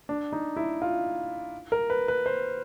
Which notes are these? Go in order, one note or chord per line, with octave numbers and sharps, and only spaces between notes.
D4
D#4
E4
F4
A#4
B4
B4
C5